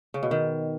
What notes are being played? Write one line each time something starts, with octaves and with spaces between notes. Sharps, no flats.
C#3
B2
D#3